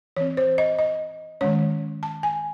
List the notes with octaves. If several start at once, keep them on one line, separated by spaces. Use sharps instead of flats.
E3 C4 C#5
C5
D#5
D#5
D#3 G#3 C#4 C#5
A5
G#5